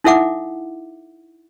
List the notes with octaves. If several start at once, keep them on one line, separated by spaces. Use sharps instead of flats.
D#4 E4 A4 E5 F#5 D6